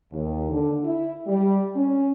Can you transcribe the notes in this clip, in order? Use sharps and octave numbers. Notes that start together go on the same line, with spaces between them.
D#2
D3
E4
G3
C#4